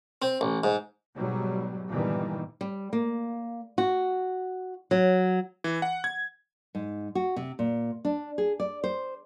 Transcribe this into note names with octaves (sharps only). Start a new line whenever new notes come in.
C4
A1
G#2
G#2 B2 F#3 G3
G1 A#2 D#3 E3 G3
G3
A#3
F#4
F#3
E3
F#5
G#6
G#2
F#4
C3
A#2
D4
G#4
D5
C5